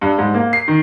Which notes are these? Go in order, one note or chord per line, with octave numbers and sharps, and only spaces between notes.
G2
G#2
A#3
C7
D#3